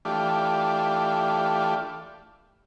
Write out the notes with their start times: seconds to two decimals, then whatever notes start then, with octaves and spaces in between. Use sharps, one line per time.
0.05 E3 A3 D4 F4 G4